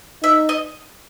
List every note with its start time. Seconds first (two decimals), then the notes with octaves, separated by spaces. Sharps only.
0.23 D#4 E5
0.49 D#5